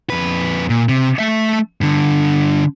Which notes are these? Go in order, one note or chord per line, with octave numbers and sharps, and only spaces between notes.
F2 B4
A#2
C3
A3 E5
G2 D3